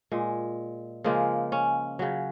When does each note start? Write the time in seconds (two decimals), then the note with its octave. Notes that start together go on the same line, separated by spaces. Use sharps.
0.11 A#2 G#3
1.04 C#3 F3 G#3 A#3
1.52 C#4
1.99 C#3 F#3